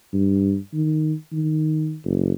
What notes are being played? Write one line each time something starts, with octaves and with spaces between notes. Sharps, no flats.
G2
D#3
D#3
F#1